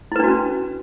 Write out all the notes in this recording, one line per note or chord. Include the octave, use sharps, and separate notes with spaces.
C#4 D4 E4 F#4 B4